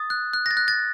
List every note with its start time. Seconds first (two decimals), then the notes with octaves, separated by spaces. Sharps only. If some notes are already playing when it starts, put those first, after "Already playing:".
Already playing: D#6 A6
0.10 F#6
0.33 F#6
0.46 A#6
0.51 A6
0.57 F#6
0.68 A6